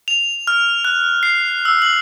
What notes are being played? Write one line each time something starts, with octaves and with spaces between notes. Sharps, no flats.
F7
F6
F#6
C7
E6
F#7